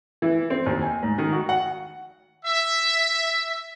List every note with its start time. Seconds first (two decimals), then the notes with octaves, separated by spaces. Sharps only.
0.22 E3
0.50 C4
0.66 D#2
0.82 G#5
1.03 G#2
1.18 D#3
1.32 F#4
1.49 F#5
2.45 E5